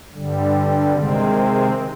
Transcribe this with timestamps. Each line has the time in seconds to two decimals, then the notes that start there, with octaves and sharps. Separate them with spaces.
0.14 G2 D3 G3
0.92 C3 D#3 G#3 C4